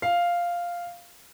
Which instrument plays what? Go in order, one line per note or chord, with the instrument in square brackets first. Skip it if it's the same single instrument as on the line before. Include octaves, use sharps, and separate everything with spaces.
[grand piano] F5